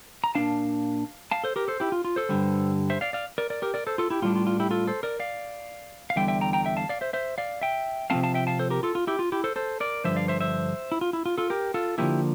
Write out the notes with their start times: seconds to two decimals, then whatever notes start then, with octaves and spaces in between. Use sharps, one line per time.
0.24 A#5
0.35 A#2 A3 D4 F5 A5
1.31 F5 A5
1.44 A4 C5
1.56 G4 A#4
1.68 A4 C5
1.80 E4 G4
1.92 F4
2.05 F4
2.16 A4 C5
2.29 G2 D3 G3
2.90 C5 E5
3.01 D5 F5
3.13 D5 F5
3.38 A#4 D5
3.50 A#4 D5
3.62 G4 A#4
3.74 A#4 D5
3.87 A4 C5
3.98 F4 A4
4.10 E4 G4
4.22 A2 G3 D4 F4
4.36 F4
4.47 F4
4.60 E4 G4
4.71 F4 A4
4.87 A4 C5
5.03 A#4 D5
5.20 D5 F5
6.10 F5
6.16 E2 D3 G3 E5 G5
6.28 E5 G5
6.41 G5 A#5
6.53 G5 A#5
6.65 E5 G5
6.77 F5 A5
6.89 D5 F5
7.01 C5 E5
7.13 C5 E5
7.38 D5 F5
7.61 E5 G5
8.10 C3 F3 A3 C4 F5 A5
8.23 F5 A5
8.34 E5 G5
8.47 F5 A5
8.59 A4 C5
8.70 G4 A#4
8.83 F4 A4
8.95 F4
9.07 E4 G4
9.19 F4
9.32 E4 G4
9.44 A4 C5
9.56 A4 C5
9.80 A#4 D5
10.04 G2 D3 F3 C5 E5
10.16 D5 F5
10.28 C5 E5
10.41 C5 E5
10.92 E4
11.01 F4
11.13 E4
11.26 F4
11.38 F4 A4
11.50 G4 A#4
11.74 F4 A4
11.98 D3 F3 A#3 E4 G4